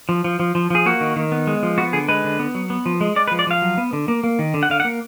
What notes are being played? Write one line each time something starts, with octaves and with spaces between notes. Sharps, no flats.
F3
F3
F3
F3
F3 G#4
A#3 F#4
D#3
D#3
B3
G#3
F3
B3 F#4
D3 G#4
G#3 B4
D3
B3
F#3
B3
F3
G#3
G#3 D5
B4
F3
D5
F3 F5
F#3
B3
D3
A#3
A#3
D#3
D3
F#5
D3 F5
F#5
A#3